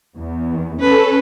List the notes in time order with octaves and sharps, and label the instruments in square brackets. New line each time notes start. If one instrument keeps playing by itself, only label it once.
[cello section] E2
[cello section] C#4 [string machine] A4 [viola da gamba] B4